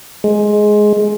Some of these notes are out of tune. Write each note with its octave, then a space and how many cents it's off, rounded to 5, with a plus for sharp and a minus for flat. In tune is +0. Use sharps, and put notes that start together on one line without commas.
G#3 +10